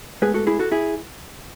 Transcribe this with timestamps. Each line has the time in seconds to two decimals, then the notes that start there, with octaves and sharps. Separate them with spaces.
0.22 A2 G#3 B3 G#4 B4
0.34 F#4 A4
0.47 E4 G#4
0.59 F#4 A4
0.71 E4 G#4